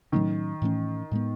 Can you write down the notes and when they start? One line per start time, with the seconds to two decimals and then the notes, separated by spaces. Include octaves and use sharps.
0.12 A2 D#3 F#3 A3 C#4
0.62 A2 E3 A3 C#4
1.12 A2 G#3 B3